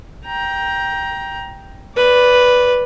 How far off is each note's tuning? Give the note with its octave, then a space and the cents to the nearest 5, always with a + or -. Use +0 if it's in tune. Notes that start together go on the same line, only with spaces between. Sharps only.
G5 +0 A#5 +20
B4 +0 D5 -10